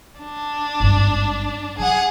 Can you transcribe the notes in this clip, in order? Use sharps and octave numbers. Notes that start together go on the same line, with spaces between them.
D4
G#1 G2
F#3 G#4 F#5